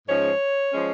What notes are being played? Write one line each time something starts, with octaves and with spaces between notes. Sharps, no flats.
G#2 F3 G#3 C#4 C#5
F3 G#3 C#4